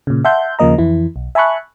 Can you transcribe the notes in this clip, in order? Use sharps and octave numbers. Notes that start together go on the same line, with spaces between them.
A#2 C#3
E5 F#5 A5 C6 G6
D#2 C#3 F3 A#3 D#5 A#5
F2 E3 E4
B1
E5 G#5 A5 B5 C#6 F#6